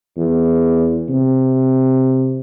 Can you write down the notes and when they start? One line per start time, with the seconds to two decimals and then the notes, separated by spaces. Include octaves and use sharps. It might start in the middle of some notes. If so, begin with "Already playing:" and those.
0.17 E2
1.09 C3